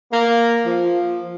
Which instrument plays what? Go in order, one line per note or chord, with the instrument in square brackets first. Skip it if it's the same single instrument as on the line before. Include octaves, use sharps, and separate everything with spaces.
[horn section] A#3
F3